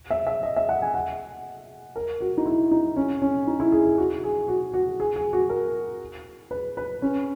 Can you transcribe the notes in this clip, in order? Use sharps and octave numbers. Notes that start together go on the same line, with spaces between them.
E5
E5
D#5
E5
F#5
G#5
F#5
A#4
F#4
D#4
E4
D#4
C#4
C#4
D#4
E4
G#4
G#4
F#4
G#4
F#4
F#4
G#4
G#4
F#4
A#4
B4
B4
C#4